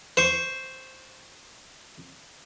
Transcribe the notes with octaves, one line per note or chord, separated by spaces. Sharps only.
C5 C#6